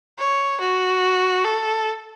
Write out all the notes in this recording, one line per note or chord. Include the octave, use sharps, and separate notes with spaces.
C#5
F#4
A4